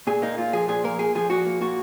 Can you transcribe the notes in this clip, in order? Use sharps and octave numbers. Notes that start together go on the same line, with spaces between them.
A#2 G#4
A#3 D#4
A#2 F4
F3 G#4
A#2 G#4
A#3 A#4
A#2 G#4
F3 G#4
A#2 F#4
A#3
A#2 F#4